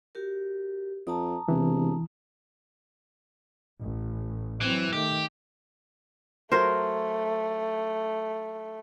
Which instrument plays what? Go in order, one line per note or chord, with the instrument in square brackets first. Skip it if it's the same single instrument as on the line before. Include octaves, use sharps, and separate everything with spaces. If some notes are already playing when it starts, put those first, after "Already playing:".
[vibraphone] F#4 G4 A#4
[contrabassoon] F2 [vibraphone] A5 A#5 D#6
[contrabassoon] E1 [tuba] C3 [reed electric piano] E3
[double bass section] A1
[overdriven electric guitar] E3 [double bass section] F#3 C4
[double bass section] D#3 A3 [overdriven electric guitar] G4
[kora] F#3 A#4 C5 [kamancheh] A3